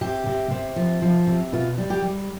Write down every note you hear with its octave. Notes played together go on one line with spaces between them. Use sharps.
C3 G4
C3
C3
F3
F3
C3
B2 F4
G3
G4
G3